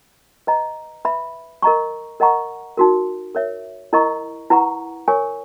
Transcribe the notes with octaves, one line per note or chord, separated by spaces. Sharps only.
B4 D#5 A#5
B4 E5 B5
A#4 D#5 A#5 C#6
A#4 D#5 F#5 A#5 C#6
D#4 F#4 A#4
A#4 C#5 E5
E4 A#4 D#5 A#5 C#6
E4 B4 F#5 A#5 C#6
A#4 C#5 G#5 C#6